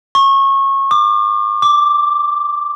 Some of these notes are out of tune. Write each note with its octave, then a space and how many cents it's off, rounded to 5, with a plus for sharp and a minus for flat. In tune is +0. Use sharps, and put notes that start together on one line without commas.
C#6 -25
D6 +35
D6 +0